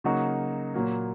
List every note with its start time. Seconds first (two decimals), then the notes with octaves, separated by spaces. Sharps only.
0.04 C#3 F#3 A#3 D#4 F#4
0.74 A#2 F#3 A#3